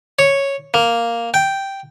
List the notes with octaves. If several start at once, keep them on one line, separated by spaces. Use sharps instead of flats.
C#5
A#3
G5